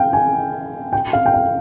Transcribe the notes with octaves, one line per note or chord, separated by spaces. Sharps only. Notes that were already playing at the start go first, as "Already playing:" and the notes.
Already playing: F5 G5
G#5
G5
F5
G5
F5